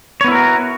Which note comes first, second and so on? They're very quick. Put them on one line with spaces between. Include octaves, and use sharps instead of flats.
C#5 B3 E4 A#4 F#4